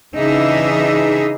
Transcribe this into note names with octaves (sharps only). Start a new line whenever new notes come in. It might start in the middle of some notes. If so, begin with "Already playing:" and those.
C#3 E3 D4 D#4 G#4 E5